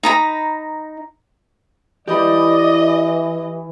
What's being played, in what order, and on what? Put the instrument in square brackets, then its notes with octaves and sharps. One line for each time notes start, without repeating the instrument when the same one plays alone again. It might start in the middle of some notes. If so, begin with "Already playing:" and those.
[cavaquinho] D#4 A#5 B5
[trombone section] E3 [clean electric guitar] G4 B5 [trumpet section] D5 [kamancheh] D#5